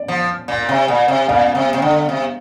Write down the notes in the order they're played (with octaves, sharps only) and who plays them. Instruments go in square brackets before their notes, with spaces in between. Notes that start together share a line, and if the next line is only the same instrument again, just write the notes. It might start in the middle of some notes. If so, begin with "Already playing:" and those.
Already playing: [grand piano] D5
[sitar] F3
A#2
C3
A#2
C3
[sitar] A#2 [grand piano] D5 F5
[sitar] C3
C3
D3
C3